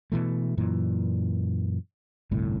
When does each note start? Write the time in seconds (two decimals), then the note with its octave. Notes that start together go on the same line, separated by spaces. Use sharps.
0.12 B2 E3 A3
0.57 F#2 A#2 E3
2.31 G1 C2 A2